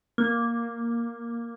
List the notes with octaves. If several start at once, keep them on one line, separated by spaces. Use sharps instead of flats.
A#3